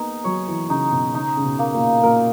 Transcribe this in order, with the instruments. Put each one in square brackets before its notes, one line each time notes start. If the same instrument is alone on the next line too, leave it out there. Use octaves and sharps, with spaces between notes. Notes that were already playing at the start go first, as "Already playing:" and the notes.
Already playing: [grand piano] A#3 B3 [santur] D#4 G#4
[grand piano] F#3 [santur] C#5
[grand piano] E3
[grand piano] C#3 [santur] D#4
[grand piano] B2
[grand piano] C#3 [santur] D#4
[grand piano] C#3
B2
[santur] A#3
[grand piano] A#2
[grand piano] A#2 [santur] A#4